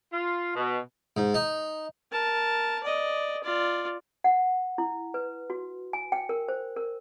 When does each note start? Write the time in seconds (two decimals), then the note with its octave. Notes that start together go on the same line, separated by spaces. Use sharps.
0.12 F4
0.56 B2
1.17 G#2
1.34 D#4
2.12 A#4 A5
2.83 D5 D#5
3.43 F4 D5
4.24 F#5
4.78 E4
5.14 B4
5.50 F#4
5.93 G#5
6.12 G5
6.29 A#4
6.48 C5
6.77 A#4